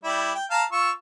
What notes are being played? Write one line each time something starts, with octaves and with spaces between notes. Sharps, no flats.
G3 E4 D5
G5
F5 A5 A#5
F4 C#6 E6